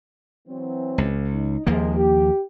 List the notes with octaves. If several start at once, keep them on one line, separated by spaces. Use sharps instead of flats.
E3 F#3 C4
C#2
D#4
D#2 G#2 C3 F3 G#3 A#3
G4